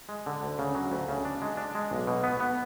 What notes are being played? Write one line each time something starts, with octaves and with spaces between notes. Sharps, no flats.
G#3
D3
D2
C#3
F#3
D2
C#3
D4
G#3
D4
G#3
B1
B2
B3
B3